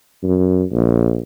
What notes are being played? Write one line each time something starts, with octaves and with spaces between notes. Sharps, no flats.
F#2
A#1